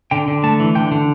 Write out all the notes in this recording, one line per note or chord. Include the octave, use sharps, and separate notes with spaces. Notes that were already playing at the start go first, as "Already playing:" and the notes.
D3 G5
D3
A3 A5
E3
D3 G5
D3